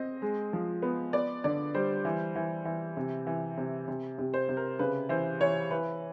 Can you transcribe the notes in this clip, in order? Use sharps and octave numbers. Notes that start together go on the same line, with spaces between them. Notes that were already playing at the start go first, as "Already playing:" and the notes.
Already playing: C4 D#5
G#3
F3
B3
B3 D5
D3 D5
G3 C5
E3
E3
E3
C3
E3
C3
C3
C3
C5
C3
A#4
C#3 B4
E3 C5
E3 C#5
E3 B4